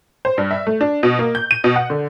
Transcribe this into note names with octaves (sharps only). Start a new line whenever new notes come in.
C5
G2
E5
A3
D4
B2
A#3
G6
D#7
B2
F#5
D3